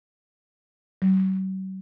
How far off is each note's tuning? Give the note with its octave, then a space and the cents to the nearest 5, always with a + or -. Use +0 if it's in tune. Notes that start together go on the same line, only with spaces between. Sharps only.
F#3 +45